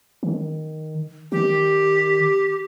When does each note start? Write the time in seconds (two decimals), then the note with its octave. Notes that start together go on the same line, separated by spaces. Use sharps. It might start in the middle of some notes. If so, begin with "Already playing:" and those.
0.23 D#3
1.32 D#3 G4